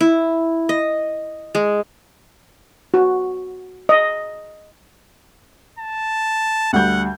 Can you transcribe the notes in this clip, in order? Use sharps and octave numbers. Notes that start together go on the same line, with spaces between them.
E4
D#5
G#3
F#4
D#5
A5
D2 G3 F#5 G6